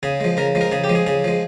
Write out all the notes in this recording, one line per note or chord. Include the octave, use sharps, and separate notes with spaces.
C#3 G#4
F3 G#3
C#3 A#4
F3 G#3
A#4
C#3 G#4
G4
F3 G#3
G#4
C#3 G#4
F3 G#3